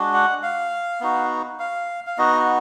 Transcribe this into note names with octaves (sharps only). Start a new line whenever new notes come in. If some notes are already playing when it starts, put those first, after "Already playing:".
Already playing: G#3 D4 F#4
F#5
F5
B3 D#4 F#4
F5
F5
B3 D#4 F#4 D#5